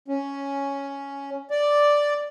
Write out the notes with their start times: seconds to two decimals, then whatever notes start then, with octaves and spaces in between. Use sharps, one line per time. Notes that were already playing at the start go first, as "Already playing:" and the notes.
0.08 C#4
1.51 D5